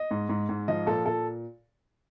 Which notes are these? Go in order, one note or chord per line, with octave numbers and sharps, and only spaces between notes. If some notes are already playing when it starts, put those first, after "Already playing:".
Already playing: D#5
G#2
G#2
G#2
F3 D#5
A#2 A4
A#2 A4